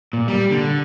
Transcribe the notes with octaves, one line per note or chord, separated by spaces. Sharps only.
A#2
G3
D3